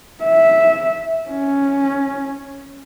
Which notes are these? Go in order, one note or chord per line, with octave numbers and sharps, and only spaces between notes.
E5
C#4